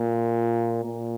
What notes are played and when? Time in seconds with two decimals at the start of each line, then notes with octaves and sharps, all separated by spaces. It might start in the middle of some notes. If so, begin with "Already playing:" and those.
Already playing: A#2
0.84 A#2